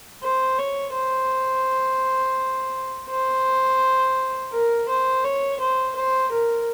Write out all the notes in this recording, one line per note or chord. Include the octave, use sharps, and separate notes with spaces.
C5
C#5
C5
C5
A#4
C5
C#5
C5
C5
A#4